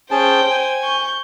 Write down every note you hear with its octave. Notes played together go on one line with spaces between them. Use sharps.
C#4 G#4 C5 G5 A5
G#5
C#6 G6